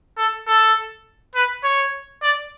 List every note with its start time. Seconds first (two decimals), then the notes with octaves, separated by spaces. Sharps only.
0.17 A4
0.47 A4
1.35 B4
1.64 C#5
2.22 D5